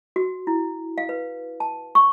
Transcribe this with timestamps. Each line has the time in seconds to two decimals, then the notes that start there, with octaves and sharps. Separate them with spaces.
0.16 F#4
0.47 E4
0.98 F5
1.09 B4
1.60 A5
1.95 C#6